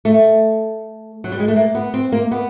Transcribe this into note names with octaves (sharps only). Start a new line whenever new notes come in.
A3
F#3
G3
G#3
A3
A#3
B3
C4
A#3
B3